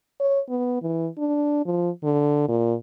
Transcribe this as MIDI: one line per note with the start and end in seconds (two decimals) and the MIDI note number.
0.20 0.40 73
0.49 0.80 59
0.82 1.08 52
1.18 1.65 62
1.65 1.90 53
2.03 2.44 50
2.48 2.74 46